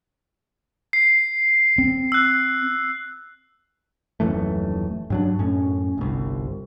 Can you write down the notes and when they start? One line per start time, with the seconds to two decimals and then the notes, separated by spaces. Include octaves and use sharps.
0.93 C7
1.78 C4
2.12 E6 F#6
4.20 D#1 F#2 E3 A3
5.10 G2 F#3 D4
5.39 F#2 A2 C#4
5.98 G1 C2